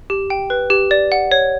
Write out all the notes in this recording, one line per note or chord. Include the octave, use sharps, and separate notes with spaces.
G4
G5
B4
G4
D5
F#5
C#5